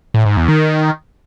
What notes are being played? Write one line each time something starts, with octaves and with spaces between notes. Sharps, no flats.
A2
G#2
E2
D#3